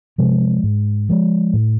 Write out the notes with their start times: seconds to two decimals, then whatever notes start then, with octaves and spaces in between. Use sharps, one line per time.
0.18 C3 F3 G#3
0.63 G#2
1.09 F3 G#3
1.53 A2